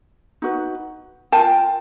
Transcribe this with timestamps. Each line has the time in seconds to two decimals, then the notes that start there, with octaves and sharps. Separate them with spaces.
0.42 D#4 F#4 B4
1.32 F4 A#4 G5 A5